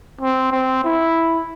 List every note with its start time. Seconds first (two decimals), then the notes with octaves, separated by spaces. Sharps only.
0.21 C4
0.52 C4
0.84 E4